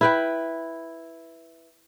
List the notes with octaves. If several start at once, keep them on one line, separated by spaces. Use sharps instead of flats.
E4 B4 G5